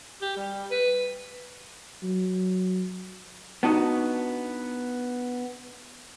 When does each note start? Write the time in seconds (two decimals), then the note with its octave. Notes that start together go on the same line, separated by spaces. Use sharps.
0.21 G4
0.37 G3
0.71 B4
2.03 F#3
3.63 B3 D4 D#4 F#4